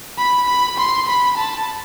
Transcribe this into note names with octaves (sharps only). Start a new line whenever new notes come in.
B5
B5
C6
B5
A5